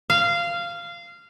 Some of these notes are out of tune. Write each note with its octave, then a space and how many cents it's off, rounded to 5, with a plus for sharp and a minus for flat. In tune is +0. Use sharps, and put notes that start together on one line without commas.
F5 -15